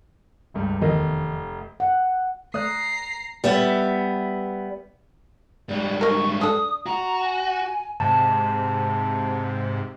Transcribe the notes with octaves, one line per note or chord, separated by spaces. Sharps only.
F1 C#2 G2
F1 E2 D#3 D#5
F#5
A3 D5 A#5 D#6 F#6 C7
G3 B3 E5
G#2 G3 D5
D#4 A#4 C#6
D4 A4 D#6
F#4 A#5
G#5
G#2 C3 A5